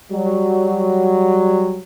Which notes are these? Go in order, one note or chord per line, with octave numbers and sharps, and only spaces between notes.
F#3 G3